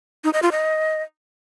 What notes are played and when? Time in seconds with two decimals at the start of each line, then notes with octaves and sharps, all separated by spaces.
0.24 D#4
0.33 D#5
0.42 F4
0.52 D#5